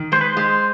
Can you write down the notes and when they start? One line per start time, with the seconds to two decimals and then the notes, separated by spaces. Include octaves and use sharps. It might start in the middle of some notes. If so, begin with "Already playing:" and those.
Already playing: D#3
0.12 G#3 C5
0.21 B4
0.29 C5
0.37 G#3